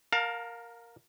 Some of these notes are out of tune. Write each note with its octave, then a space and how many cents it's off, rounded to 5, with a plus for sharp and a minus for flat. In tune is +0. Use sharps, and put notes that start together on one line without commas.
A#4 +0 F5 +25 A5 +30